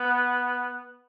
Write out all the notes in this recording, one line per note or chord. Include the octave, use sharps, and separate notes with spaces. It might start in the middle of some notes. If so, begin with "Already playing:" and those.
Already playing: B3